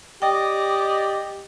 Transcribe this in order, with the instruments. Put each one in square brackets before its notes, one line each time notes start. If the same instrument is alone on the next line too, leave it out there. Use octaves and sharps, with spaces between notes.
[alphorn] G4 [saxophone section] D5 D#5 [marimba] G5